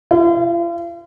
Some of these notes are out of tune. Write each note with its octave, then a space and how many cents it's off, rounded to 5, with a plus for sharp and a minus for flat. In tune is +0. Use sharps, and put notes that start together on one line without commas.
F4 -45